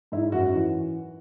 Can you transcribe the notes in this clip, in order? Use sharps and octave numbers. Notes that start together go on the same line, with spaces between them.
G#2 E4
F#2 F#4
E3